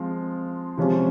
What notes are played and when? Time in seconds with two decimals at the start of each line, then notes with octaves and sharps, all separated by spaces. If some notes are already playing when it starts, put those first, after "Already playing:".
Already playing: F3 G#3 C4 F4
0.77 C3 F3 G#3 C#4 F4